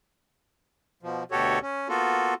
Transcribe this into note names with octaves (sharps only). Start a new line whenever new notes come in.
B2 F3
D2 B2 F#4 G4 A4 C#5
C#4
A#3 B3 F4 F#4 A4